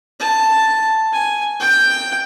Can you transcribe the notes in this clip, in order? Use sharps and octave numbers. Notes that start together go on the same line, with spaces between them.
A5
G#5
G5